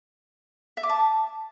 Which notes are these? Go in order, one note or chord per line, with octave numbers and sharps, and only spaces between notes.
E5
D6
A5